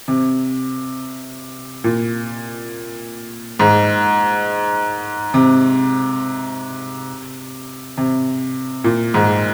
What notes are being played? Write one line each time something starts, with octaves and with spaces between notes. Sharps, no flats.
C3
A#2
G#2
C3
C3
A#2
G#2